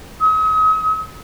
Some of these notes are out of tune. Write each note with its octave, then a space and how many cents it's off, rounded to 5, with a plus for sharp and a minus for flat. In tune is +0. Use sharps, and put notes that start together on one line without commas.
D#6 +40